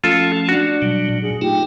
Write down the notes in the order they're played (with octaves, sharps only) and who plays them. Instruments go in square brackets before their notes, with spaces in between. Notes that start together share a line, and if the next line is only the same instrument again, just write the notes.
[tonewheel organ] F3 A3 C#4 [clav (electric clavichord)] F4 A4
[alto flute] D4 [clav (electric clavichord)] F#4
[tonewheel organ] B2 F#3 G3
A#2 F#3
[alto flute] G#4
[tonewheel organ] A3 D#4 F4 [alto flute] G4